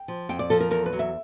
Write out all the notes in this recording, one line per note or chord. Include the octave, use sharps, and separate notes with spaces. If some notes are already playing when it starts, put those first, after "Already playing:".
Already playing: G5
F3
F2 G5
D5
F3 A4
A#4
E2 A#4
B4
F#3
E5